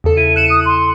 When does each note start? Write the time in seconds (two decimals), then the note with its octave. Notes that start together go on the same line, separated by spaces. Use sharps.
0.04 E2 C#3 A4
0.17 E4 D#7
0.36 F#6 C#7 D#7 E7
0.50 D#6
0.66 C6